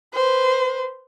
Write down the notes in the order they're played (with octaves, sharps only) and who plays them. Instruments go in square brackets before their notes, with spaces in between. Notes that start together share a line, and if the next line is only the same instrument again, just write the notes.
[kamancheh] B4 C5